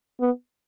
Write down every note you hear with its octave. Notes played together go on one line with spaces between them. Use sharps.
B3